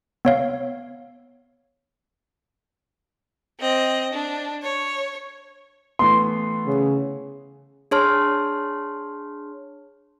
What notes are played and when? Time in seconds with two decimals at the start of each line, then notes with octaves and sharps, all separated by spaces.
0.25 B3 C#5 F5
3.60 C4 D#5
4.13 D4
4.62 C#5
5.99 E3 A3 B3 C6
6.67 C#3
7.91 D4 G#4 C#5 A5 C6 F6